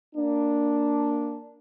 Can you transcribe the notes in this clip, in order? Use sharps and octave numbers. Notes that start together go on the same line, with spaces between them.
A#3 D4